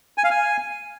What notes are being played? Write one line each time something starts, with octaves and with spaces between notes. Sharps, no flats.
G#5
F5
G#5